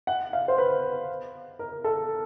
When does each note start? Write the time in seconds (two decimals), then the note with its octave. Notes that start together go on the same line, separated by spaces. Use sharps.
0.07 F#5
0.33 F5
0.48 C5
0.58 B4
1.59 A#4
1.84 A4